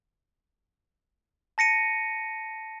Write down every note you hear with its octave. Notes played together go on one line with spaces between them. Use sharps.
A5 A#6 C#7 D#7